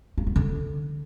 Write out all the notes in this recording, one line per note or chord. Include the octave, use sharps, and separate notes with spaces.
A#3
B3
D3